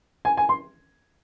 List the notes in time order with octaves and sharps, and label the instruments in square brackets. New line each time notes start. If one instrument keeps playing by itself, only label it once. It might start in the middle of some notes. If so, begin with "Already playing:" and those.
[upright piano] G#5
G#5
C6